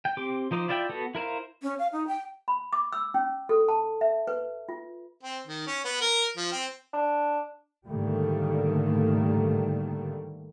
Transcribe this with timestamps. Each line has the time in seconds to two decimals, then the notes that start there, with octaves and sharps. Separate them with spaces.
0.05 G5
0.17 C4 G4 C6 D6
0.51 F3 D#4 C5 D6
0.68 E4 F4 D5 E5 G5
0.89 B3 F#4 A4
1.15 E4 A#4 C5 F5
1.63 C#4
1.79 F5
1.92 D#4
2.08 G5
2.48 B5
2.73 D6
2.93 E6
3.14 C#4
3.49 A4
3.69 A5
4.01 E5
4.27 B4
4.69 F4
5.23 C4
5.47 D#3
5.67 C#4
5.85 B3
6.01 A#4
6.37 F3
6.52 C4
6.93 D4
7.87 G#2 D3 D#3 G3 A3 A#3